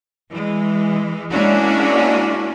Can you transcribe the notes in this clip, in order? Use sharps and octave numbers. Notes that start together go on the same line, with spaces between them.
E3 G#3
G#3 A#3 C#4 D4 E4 F#4